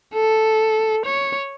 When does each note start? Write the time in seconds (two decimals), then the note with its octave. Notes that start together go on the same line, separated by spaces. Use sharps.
0.14 A4
1.06 C#5